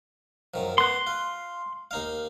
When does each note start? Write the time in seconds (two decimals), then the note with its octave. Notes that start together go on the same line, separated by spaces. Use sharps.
0.54 F#2 D#3 F3
0.78 B3 C6 F#6
1.07 F4
1.91 D#2 D#4 F5